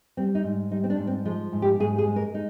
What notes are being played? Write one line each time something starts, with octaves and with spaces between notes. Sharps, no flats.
G3 C4
D#4
G#2
G3 D#4
C4
D4
G#2
C4
F3 G#3
G#2
G4
G#2 G#4
G#4
G#3
A#4
G#3 D#4